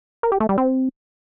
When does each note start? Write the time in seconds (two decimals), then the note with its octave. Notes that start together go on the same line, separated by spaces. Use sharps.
0.23 A#4
0.32 G4
0.40 A3
0.49 G3
0.58 C4